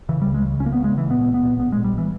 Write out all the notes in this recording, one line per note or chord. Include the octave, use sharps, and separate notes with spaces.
C#3 E3
G3
C#2
G#3
C#3
C#2 C#4
A#3
B3
C#3
G#3
C#2
E3
A#2 B3
A#1
B3
A#2
A#1 B3
G#3
A#2
G3
A#1
E3